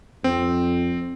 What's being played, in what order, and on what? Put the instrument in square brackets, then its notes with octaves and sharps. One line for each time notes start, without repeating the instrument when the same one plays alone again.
[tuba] F2 [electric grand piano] C4